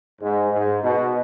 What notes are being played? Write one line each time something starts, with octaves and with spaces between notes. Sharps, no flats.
G#2
G#2
B2